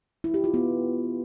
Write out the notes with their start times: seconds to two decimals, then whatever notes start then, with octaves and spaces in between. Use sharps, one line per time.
0.24 E4
0.34 G4
0.44 F4
0.54 B3